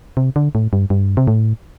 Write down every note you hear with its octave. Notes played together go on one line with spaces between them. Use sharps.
C3
D3
A2
G2
G2
C3
A2